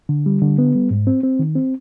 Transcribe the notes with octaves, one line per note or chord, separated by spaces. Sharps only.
D3
G3
D3
B3
G3
G#2
C4
C4
D#3
C4